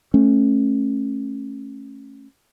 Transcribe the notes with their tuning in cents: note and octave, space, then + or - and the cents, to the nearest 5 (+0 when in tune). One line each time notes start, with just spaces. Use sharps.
A3 +0 C#4 -25